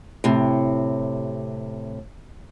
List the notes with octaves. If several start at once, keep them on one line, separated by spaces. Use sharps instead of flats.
A2 C3